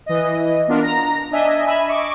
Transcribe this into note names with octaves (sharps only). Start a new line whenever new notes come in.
E3 D#5
B3 D4 F4 A#4
A#5 A#6
D4 D#5 E5 G#5
E5 G#5 B5 E6
D#5 C#6 D6